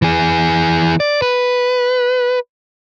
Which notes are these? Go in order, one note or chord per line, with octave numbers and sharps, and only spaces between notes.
E3 G#4
D5
B4